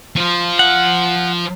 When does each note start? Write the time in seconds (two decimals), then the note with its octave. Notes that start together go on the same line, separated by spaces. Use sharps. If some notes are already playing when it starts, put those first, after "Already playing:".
0.16 F3 F4
0.59 F#5